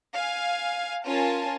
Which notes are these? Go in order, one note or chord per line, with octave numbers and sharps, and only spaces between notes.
F5 G#5
C#4 F4 A#4 G#5 A5